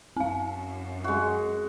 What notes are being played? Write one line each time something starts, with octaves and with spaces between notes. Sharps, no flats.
F#2 C4 F5
G#3 F#4